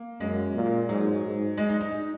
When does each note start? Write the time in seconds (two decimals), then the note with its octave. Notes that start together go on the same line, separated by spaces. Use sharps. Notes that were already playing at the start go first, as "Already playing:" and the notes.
Already playing: A#3
0.20 F#2 G#3
0.54 A#2
0.89 G#2 F#3
1.24 G#2
1.57 G#3
1.69 D#4
1.81 D#4
1.91 D#4